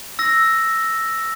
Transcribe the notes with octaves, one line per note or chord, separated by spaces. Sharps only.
E6 A#6